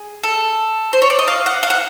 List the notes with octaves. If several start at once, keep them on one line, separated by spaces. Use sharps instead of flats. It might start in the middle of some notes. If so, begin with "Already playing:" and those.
Already playing: G#4
A4
C5
C#5
D5
D#5
F5
F#5
F5
F#5